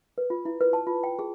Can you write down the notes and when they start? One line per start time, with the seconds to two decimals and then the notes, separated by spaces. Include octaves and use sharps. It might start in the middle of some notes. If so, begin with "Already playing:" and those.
0.18 B4
0.30 F4
0.45 E4
0.61 B4
0.73 A5
0.87 F4
1.03 G5
1.19 G#4